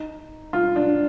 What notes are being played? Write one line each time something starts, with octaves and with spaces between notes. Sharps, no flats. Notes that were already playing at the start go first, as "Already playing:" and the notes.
Already playing: D#4
F4
D4